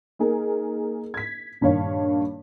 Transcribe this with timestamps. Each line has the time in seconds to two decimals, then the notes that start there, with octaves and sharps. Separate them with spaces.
0.19 A#3 D#4 G#4 A#4
1.14 G#6 B6
1.61 A#1 G2 D#3 C#5 F5